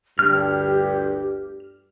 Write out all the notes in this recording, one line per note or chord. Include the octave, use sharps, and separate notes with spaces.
G1 D2 G2 G4 F6